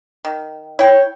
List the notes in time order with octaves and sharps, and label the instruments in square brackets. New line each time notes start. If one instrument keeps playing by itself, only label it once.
[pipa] D#3
[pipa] E4 G5 [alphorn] C#5